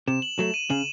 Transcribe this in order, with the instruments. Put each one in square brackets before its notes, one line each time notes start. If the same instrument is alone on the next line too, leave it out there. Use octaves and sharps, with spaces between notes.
[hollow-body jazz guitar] C3 [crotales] E7
[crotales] F#7
[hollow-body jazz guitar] F#3 A3 [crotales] E7
[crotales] D#7
[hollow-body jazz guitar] C#3 [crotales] F#7